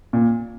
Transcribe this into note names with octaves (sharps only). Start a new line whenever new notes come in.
A#2